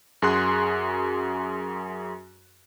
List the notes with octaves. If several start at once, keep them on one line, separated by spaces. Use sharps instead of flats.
F#2 F#4 G#4 C6 F#6